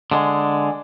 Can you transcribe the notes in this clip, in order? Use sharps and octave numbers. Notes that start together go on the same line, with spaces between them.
D3 G#3